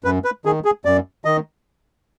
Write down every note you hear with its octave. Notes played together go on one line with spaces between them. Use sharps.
F#2 B4
B4
D#3 G#4
G#4
F#2 D5
D#3 D#5